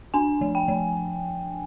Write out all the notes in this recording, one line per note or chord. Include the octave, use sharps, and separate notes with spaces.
D4 G#5
F3
G5
F3